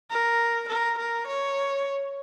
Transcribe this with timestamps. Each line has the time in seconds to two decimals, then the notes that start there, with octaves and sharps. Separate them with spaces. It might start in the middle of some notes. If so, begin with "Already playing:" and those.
0.10 A#4
0.68 A#4
0.98 A#4
1.27 C#5